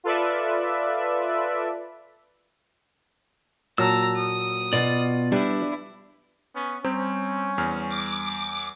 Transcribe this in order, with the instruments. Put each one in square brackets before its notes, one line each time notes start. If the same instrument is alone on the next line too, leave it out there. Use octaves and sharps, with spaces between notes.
[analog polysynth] F4 A4 B4 D5 E5
[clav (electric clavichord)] A#2 F#3 [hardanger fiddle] A5 A#5 [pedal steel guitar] E6
[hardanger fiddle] D#6
[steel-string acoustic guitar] B2 [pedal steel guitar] F4 D5
[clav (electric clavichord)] G3 [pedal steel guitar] D4 B4 [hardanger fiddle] E4
[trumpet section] B3 C#4
[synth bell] G3 C6 G6 [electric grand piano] C4 [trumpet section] C#4
[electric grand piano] E2 F6
[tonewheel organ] D6